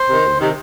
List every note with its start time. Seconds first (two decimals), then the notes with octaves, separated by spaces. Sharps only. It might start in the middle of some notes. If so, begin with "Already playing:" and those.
Already playing: C5
0.09 C3 D#3
0.25 D2
0.40 C3 D#3